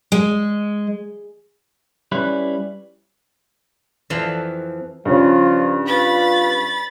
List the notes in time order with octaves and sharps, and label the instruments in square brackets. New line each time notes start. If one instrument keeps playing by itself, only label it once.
[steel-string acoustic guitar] G#3
[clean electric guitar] G3 C#4 E4 B4
[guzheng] F2 E3 F3 F5 A5 C6
[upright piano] G2 C#3 C#4 [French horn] F3 [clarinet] F4
[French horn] F4 [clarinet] B4 [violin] B5 A6